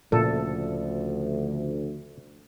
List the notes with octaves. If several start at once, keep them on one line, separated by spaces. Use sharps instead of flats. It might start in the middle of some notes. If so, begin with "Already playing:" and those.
D2 A#2 C#3 F3 A4